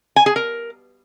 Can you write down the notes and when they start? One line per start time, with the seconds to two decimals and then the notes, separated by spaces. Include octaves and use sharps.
0.16 G#5
0.26 G#4
0.36 A#4